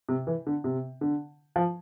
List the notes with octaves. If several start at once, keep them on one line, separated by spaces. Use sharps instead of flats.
C3
E3
D3
C3
D3
F3